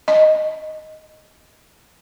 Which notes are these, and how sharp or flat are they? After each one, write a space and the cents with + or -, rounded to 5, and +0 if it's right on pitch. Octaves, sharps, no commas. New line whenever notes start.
D#5 +0